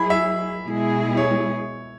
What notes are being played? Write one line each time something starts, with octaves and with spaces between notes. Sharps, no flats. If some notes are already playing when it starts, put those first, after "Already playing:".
Already playing: F#3 E4 G#4 B5
E5
B2 G#3 E4 G#4
C#5